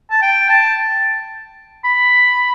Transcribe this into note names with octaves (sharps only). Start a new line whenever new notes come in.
A5
G5
A5
B5